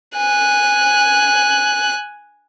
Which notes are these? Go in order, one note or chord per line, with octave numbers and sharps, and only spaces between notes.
G#5 F#6